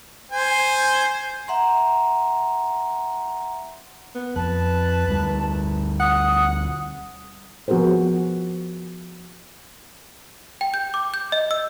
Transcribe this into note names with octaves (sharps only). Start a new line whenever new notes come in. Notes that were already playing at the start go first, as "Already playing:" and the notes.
C5 G#5
E5 F#5 A#5 C6
B3
F2 B4 A5
D2 G3
F#5 D#6
F3 B3 F#4 G#4 A#4 C5
G5
G6
D6
G6
D#5
E6